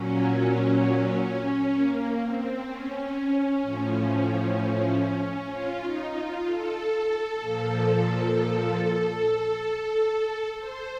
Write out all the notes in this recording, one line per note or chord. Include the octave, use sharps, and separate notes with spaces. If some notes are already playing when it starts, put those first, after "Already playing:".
Already playing: A#2 F#3 C#4
A#3
C4
C#4
A2 F3
F4
D#4
F4
A4
A#2 F3
C5